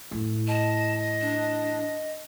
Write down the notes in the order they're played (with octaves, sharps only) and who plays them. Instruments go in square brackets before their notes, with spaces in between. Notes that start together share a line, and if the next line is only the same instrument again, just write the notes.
[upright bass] A2 E3
[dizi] D#5 [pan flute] A5
[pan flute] D4